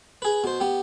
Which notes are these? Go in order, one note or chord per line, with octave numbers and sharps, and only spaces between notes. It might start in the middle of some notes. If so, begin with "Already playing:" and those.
G#4 B4
B2 C5
B3 G4